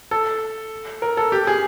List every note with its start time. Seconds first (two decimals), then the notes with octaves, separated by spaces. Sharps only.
0.11 A4
1.02 A#4
1.17 A4
1.32 G4
1.47 G#4